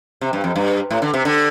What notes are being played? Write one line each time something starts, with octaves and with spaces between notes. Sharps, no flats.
C3
G2
F2
G2
A2
D3
C3
D3